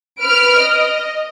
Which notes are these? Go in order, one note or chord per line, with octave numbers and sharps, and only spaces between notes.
B4 F6 D7
D#5